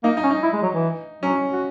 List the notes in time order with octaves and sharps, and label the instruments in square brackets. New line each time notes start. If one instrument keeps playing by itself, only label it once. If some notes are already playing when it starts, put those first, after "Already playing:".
[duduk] A#3 [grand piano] D#4
[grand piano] D#4
[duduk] C#4
[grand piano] D#4
[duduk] E4
G#3
F#3
E3
[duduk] F#3 [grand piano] C#4
[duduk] F#4